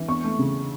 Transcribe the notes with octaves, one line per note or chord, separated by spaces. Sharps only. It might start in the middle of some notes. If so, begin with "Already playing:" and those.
Already playing: E3
E2 C#6
A3
C#3